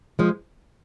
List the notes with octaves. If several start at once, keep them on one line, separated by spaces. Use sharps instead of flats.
F3 G#3